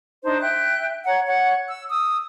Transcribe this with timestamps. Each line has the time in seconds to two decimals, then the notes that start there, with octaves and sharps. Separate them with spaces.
0.24 D4 D#4 C5 A5
0.41 E5 G5 F#6
1.06 C#5 F#5 A#5
1.26 C#5 F#5
1.69 E6
1.90 D#6 E6